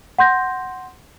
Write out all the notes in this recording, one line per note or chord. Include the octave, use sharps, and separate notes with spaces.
F#5 C6 G6 A#6